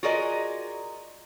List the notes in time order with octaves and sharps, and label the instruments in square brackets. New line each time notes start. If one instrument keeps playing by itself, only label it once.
[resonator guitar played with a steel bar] F4 F#4 G#4 A#4 D5 D#5